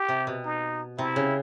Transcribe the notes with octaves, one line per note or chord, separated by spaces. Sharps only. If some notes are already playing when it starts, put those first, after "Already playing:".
Already playing: G4
C3
B2
D#4
C3 E4
C#3